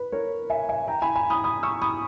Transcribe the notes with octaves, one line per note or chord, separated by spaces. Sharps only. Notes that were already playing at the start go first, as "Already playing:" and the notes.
Already playing: B4
A#4 C#5
E5 G#5
E5 G#5
G5 A#5
G#5 B5
G#5 B5
B5 D#6
B5 D#6
C#6 E6
B5 D#6